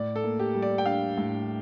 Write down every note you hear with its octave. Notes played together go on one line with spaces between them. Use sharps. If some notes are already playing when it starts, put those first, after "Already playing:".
Already playing: A2 D5
A4
A#3
G4
G3
D5
G5
D4 F5
A2